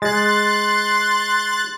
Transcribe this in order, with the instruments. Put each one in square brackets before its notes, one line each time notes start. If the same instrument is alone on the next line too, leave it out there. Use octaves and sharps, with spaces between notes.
[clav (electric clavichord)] G#3 [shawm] C6 [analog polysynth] F#6 A6